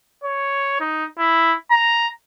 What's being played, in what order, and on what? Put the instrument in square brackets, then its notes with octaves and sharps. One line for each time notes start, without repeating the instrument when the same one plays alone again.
[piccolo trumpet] C#5
D#4
E4
A#5